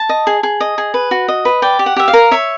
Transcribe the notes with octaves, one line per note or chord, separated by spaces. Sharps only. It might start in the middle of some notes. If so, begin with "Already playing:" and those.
Already playing: A5
D#5
G#4
G#4
D#5
G#4
B4
F#4
D#5
B4
D5 G5
G4
F#5
G4 E5
F5
A#4
C#5 E5